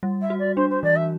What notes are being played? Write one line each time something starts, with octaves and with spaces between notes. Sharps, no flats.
G3
E5
F#4
D5
D4 C5
C5
E3 D5
E5